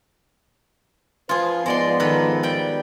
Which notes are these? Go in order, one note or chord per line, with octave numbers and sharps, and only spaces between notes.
F3 F4 G#4 B4
G#2 F3 G#3 B3 D5 C6
D#3 A4 B4
G3 G5